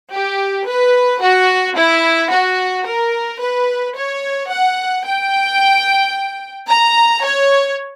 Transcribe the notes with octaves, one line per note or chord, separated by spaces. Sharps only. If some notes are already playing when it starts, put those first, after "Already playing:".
G4
B4
F#4
E4
F#4
A#4
B4
C#5
F#5
G5
A#5
C#5